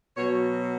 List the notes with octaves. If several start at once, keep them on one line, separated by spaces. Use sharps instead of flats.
B2 F#3 C#5